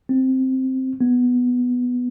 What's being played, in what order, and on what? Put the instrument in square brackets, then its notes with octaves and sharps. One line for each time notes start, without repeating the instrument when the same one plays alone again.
[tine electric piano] C4
B3